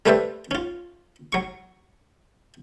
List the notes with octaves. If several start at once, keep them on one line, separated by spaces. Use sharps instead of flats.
G3 A3 B4 C5 D5 E5
C#4 F4
F#3 C#6